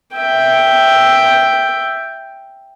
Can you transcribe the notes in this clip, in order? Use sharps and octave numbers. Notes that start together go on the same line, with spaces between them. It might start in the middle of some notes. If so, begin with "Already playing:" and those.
E5 G5